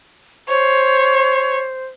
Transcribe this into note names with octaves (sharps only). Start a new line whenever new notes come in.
C5 C#5